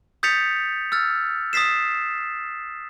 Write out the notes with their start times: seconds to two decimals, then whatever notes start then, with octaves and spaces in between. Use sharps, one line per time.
0.23 D#6 G6 A6 B6 C#7 F7
0.92 E6 F6 A6
1.53 D#6 A6 B6 C7 E7